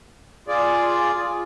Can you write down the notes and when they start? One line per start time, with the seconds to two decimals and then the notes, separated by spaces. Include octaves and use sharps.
0.48 F4 G#4 D5